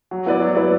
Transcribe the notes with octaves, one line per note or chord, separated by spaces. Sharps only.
F#3
B3 E4 B4 D5
F#3
B3 E4 B4 D5